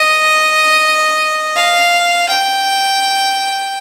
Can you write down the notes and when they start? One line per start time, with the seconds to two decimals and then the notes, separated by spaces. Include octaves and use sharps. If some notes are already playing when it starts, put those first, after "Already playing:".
Already playing: D#5
1.56 F5
2.29 G5